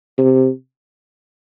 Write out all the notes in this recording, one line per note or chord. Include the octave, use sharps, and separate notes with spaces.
C3